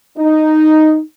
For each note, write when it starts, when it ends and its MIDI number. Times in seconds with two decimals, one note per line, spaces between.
0.18 1.00 63